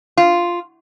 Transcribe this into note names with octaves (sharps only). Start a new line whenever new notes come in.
F4